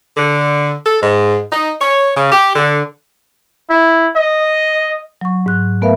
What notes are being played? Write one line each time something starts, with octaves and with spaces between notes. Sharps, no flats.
D3
A4
G#2
D#4
C#5
C#3
G4
D3
E4
D#5
F#3 C#6
G#2 F#6
A3 B3 A#4 B4 E5 F5